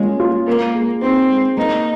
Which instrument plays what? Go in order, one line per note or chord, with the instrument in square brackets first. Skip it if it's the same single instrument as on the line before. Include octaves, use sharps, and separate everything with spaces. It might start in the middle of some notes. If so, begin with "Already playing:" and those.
Already playing: [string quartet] G#3 [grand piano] A#3 C#4 F4
[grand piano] F4
[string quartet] A#3 [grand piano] A#4
[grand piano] G#3
[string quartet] C4 [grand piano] D#4
[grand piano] G#3
[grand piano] A#3 [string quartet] D#4